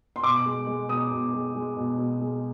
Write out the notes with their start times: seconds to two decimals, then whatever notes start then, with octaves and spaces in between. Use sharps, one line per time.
0.16 C6
0.23 B2 D6
0.46 G#3
0.67 G#3
0.89 B2 D#6
1.11 B2
1.34 G#3
1.55 G#3
1.76 B2
1.98 B2
2.21 G#3